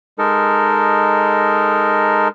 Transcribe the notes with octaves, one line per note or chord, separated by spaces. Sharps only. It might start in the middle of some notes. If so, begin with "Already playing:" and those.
G#3 D#4 A4 A#4